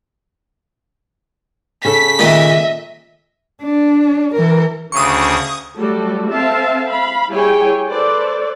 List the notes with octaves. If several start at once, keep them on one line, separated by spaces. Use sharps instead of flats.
C#3 A4 B6
A#2 D#3 D#5 E5
D4
E3 A#4
D2 C#3 C#6 D#6
F#3 G3 A3 F#4 A4
C4 A4 E5 F5 A5
F5 B5
G3 E4 G#4 C#5 G5 G#5
A4 B4 C5 D5